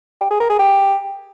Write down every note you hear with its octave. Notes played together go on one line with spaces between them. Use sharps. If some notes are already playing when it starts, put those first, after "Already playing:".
G4
G#4
A#4
G#4
G4